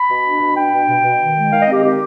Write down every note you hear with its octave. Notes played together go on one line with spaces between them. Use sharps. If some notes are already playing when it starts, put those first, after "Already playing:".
Already playing: B5
B2
D4
B2
D4 G5
B2
B2
B2
D#3
G#3
D#3 F5
D#5
C4 G4
D#3 G4